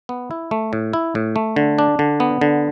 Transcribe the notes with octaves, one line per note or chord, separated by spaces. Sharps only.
B3
E4
A3
A2
E4
A2
A3
D3
D4
D3
B3
D3